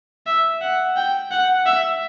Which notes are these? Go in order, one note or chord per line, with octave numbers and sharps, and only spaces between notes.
E5
F#5
G5
F#5
E5